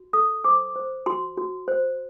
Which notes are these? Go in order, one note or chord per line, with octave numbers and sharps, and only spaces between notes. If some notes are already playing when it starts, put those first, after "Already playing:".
Already playing: F#4
A4 D#6
C5 D6
C5
F#4 C6
F#4
C5